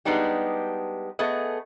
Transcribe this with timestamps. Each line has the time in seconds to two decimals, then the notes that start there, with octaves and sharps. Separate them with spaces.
0.05 G3 G#3 B3 D4 D#4 G4
1.19 A3 B3 G#4 D#5